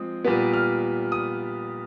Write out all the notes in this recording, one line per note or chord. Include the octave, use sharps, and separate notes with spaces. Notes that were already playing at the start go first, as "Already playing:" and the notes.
Already playing: F3 G#3 C4 D#6
A#2 G3 B3
F6
D#6